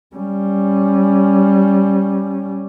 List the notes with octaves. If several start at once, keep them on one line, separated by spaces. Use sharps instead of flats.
G3 C#4